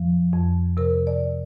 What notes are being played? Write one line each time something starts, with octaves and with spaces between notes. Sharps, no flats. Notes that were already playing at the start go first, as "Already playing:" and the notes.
Already playing: F2 F3
F2
C3 A#4
D5